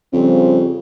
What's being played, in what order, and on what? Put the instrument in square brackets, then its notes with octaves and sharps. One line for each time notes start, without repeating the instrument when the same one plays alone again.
[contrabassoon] F2 [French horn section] C#3 G3 C4